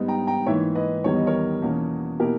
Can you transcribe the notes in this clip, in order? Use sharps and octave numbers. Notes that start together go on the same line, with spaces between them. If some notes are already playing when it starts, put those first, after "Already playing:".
Already playing: G#2 G3 B3 D#4
G5 A#5
G5 A#5
G#2 E3 A#3 C#5 E5
B4 D#5
E2 D#3 G3 B3 C#5
D#5
A#4 C#5
E2 B2 A#3 C#4
B2 A#3 E4 G4 A#4